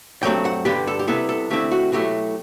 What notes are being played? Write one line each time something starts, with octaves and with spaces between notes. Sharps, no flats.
G2 F#3 A3 C4 G5
F#5
G2 D3 G3 B3 G4
A4
G4
C3 G3 B3 E4 A4
A4
D3 A3 C4 E4 G4
F#4
B2 F#3 A3 E4 G4